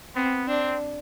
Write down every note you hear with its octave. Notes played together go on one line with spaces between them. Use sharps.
B3 C4
C4 D4